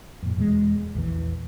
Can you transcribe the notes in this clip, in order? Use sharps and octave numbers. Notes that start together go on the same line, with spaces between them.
F2 A#2
E2 B2 F#3 G#3
A#1 E2 E3